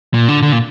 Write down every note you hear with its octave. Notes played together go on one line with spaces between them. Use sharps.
A#2
D3
D3
A#2